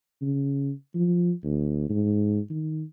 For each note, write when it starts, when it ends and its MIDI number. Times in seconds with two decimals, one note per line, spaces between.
0.22 0.72 49
0.95 1.32 53
1.44 1.85 38
1.90 2.40 44
2.50 2.84 51